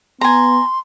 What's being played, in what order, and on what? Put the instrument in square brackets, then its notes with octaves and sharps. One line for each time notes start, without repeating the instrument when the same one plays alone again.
[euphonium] B3 [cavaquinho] G#5 A#5 [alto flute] C6